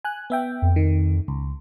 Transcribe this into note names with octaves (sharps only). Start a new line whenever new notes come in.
G#5 F#6
B3 E5 G5
F2
D#3
C#2